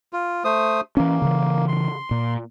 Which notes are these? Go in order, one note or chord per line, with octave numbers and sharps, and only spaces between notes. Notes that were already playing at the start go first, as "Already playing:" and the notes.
F4
A3 C5 D#6
E3 A#3 C#4
C#3 E3
C6
A#2